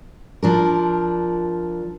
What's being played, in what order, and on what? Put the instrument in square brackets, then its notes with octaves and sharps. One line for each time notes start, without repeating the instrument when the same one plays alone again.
[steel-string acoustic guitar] F3 D4 A#4